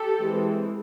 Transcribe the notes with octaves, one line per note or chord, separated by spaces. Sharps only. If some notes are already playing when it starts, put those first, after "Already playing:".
Already playing: G4 A4
E3 G#3 C4